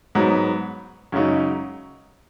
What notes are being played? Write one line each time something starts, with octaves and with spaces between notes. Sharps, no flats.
G#2 F#3 B3
F#2 C#3 G#3 D#4 F#4